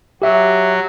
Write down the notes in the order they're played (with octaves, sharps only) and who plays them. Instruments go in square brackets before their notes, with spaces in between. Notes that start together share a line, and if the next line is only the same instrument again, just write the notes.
[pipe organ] F#3 [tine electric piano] G4 E5